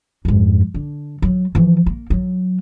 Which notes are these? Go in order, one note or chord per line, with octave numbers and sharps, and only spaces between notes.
F2 G#2
D3
F#3
E3 F3
A#3
F#3